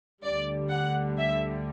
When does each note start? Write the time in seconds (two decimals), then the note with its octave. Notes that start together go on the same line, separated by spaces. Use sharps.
0.24 D2 D3 G3 D5
0.71 F#5
1.19 E5